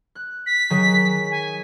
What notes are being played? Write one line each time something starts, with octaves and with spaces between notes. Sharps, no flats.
F#6
B6
D#3 F#3 G#4
G#5